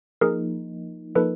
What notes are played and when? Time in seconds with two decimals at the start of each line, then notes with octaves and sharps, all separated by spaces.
0.21 F3 A#3 D#4 G#4 A#4
1.15 F3 A#3 D#4 A4 B4